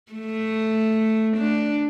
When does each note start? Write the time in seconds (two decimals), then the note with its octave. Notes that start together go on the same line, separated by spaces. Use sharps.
0.13 A3
1.37 D4